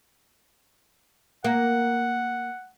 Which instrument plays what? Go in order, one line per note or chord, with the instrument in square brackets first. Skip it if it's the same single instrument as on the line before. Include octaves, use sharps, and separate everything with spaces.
[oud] A#3 [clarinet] F#5